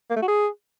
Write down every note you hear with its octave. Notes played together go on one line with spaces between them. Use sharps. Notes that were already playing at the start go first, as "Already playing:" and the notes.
A#3
A3
F#4
G#4